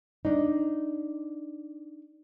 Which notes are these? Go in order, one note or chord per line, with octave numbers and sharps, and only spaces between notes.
D4 D#4